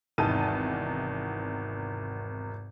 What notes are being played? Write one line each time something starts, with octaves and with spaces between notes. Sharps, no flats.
G#1 E2 C3 D#4 A5 D#7